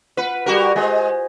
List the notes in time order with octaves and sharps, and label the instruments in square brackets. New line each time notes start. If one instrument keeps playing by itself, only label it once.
[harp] F4 F#5 B5 [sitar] B4
[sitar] G3 F#4 A#4
[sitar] G#3 [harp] C5 D#5 G#5